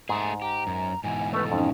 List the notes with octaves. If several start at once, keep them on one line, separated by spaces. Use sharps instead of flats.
G#2 A3 G#4
G4 A#5
F#2
G#2 B2 E3 G#5
A3 A4 B4
F2 C#4 D#4